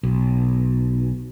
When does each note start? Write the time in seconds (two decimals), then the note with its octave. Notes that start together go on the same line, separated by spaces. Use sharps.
0.03 B1